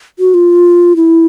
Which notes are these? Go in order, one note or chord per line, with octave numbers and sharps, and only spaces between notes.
F#4
F4
E4